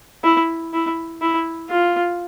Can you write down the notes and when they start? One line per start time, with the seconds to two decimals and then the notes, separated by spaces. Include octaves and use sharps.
0.24 E4
0.73 E4
1.22 E4
1.70 F4